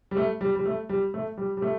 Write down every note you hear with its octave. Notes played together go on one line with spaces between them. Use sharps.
G3
A3
G3
G3
A3
G3
A3
G3
G3
A3